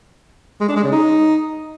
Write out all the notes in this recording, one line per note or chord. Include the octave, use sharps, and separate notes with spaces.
G#3
D4
G#3
C#3
D#4